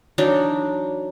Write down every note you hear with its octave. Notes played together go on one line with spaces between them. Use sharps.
E3 F#3 D4 D#4